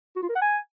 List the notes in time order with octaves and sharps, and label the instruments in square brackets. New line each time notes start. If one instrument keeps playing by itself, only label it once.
[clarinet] F#4
F4
A#4
F#5
G#5